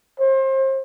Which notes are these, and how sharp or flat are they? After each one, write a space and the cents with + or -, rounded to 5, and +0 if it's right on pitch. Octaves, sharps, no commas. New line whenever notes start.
C5 +30